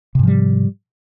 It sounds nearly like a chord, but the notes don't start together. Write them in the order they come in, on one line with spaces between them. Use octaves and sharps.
C3 G#2 F3 G3